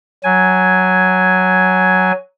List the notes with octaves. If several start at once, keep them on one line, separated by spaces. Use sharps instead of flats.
F#3 G#5